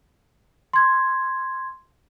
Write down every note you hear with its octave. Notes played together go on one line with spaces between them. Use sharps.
C6 G#6